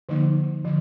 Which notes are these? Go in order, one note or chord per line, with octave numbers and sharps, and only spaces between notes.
D3 F3 A#3 D#4
D3 F3